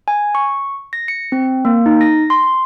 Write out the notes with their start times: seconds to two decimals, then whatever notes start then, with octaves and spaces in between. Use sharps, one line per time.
0.08 G#5
0.35 C#6
0.93 A#6
1.08 C#7
1.32 C4
1.65 A#3
1.86 D#4
2.01 A#6
2.30 C6